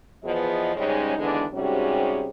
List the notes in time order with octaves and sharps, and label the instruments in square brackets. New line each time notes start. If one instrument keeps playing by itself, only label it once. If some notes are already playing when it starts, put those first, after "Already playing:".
[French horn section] E2 F3 B3 G#4 D#5
G#2 C#3 G3 G#3 C#4 D#4
D#2 D3 E3 G#3 B3 D4
G#2 C3 G3 C#4 F#4 G#4